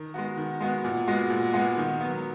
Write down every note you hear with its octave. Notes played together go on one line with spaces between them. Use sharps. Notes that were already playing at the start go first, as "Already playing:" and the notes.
Already playing: D#3
G#3 B3 F#4
D#3
G#3 B3 F#4
A#2
G#3 B3 F#4
A#2
G#3 B3 F#4
D#3
F#3 B3